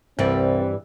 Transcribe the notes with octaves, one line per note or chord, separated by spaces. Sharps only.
C2 G2 E3 C4 D5